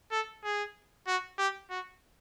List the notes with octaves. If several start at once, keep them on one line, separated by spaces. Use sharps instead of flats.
A4
G#4
F#4
G4
F#4